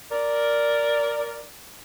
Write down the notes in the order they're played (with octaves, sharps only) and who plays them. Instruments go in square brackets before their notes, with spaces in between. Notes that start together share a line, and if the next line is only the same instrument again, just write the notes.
[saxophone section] A#4 D5